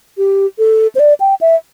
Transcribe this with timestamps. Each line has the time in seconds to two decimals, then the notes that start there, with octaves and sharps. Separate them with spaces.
0.18 G4
0.59 A4
0.95 C5
0.99 D5
1.20 G5
1.41 E5